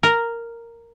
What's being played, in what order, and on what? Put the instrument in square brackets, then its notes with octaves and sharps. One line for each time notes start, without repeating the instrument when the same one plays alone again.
[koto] A#4